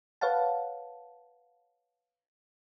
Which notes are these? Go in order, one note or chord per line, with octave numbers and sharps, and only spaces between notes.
B4 C#5 F5 F#5 A5